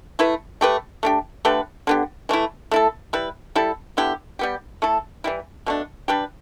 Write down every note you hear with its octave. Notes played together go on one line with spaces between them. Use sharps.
A3 E4 B4
A3 G4 B4
A3 D4 G4
D3 A3 G4 B4
D3 B3 G4
E3 A3 E4
A3 E4 A4
G3 E4 B4
G3 E4 A4
D3 B3 E4 G4
G3 B3 G4
A3 E4 A4
E3 G3 E4
B2 A3 D4
G3 D4 G4 B4